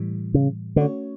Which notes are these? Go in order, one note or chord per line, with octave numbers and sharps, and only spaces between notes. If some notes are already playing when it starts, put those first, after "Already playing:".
Already playing: A2 E3 G3
C#3
D3 A3 C#4 F#4 C#5